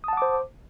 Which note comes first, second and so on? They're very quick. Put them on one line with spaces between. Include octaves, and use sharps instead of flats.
D#6 A5 F#5 D6 C5